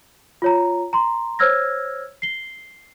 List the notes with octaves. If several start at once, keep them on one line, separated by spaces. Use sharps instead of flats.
F4 C#5 A#5
A#5 C6
C5 C#5 E6 F6 G#6 A#6
C7 G7